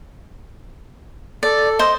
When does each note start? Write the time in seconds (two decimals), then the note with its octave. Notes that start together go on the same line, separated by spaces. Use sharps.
1.43 A4 D5
1.79 C5 D#5